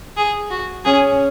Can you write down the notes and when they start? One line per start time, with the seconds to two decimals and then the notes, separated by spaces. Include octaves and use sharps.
0.17 G#4
0.50 F#4
0.85 C#4 G#4